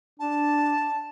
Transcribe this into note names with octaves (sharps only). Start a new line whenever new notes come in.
D4 A5